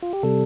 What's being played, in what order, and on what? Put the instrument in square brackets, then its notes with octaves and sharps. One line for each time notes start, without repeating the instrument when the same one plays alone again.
[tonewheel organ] F4
G4
C3 G3 A4